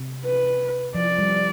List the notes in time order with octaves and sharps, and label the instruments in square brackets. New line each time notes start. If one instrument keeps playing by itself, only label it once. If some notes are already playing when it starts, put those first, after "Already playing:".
Already playing: [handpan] C3
[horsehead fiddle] B4
[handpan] F3 [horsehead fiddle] D5
[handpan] G3